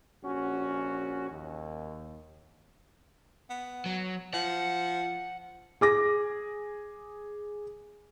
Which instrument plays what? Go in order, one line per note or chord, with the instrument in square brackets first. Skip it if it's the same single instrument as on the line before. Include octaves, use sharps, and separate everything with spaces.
[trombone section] A#1 C#4 F#4
D#2
[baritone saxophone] B3
[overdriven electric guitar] F#3
[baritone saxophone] F3 [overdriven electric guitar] F#5
[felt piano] G#4 D6 A#6